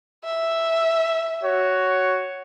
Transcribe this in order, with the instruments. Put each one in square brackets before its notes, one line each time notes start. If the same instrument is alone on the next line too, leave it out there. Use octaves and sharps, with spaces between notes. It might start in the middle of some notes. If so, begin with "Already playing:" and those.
[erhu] E5
[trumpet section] F#4 C#5